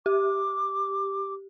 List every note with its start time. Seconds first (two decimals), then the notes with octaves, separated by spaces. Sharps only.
0.06 G4 D6